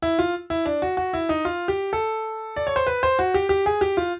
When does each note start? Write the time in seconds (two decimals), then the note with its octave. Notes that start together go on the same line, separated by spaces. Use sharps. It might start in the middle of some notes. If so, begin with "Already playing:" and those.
0.02 E4
0.19 F4
0.50 E4
0.66 D4
0.82 F#4
0.97 F#4
1.13 E4
1.29 D#4
1.45 F4
1.68 G4
1.93 A4
2.56 D5
2.67 C#5
2.76 C5
2.87 B4
3.03 C5
3.19 F#4
3.34 G4
3.49 G4
3.66 G#4
3.81 G4
3.97 F4